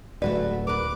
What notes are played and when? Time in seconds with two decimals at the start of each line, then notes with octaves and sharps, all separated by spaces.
0.22 D1 A3 F#4 B4 D5
0.67 A#4 B4 D6